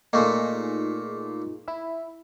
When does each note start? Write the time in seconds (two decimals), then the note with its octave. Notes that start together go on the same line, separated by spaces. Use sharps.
0.13 A#2 A3 A#3 D#4 F4 G#4
1.68 E4 E5